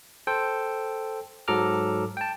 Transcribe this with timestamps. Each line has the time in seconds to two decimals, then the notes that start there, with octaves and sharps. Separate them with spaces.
0.27 A4 C5 G5
1.48 G#2 F#3 A4 A#5 D6 F6
2.17 G5 A5